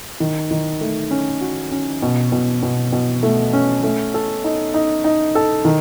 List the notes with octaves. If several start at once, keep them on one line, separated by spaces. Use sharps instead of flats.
D#3
D#3
A3
C#4
F#4
C#4
B2
B2
B2
B2
A3
C#4
A3
A4
D#4
D#4
D#4
A4
D#3